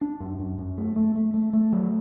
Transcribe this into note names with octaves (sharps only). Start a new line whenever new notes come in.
D4
F#2
F#2
F#2
A3
A3
A3
A3
A3
F#3